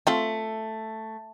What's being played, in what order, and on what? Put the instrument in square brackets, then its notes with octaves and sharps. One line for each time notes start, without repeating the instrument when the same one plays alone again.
[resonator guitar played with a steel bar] A3 [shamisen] C4 F4 A4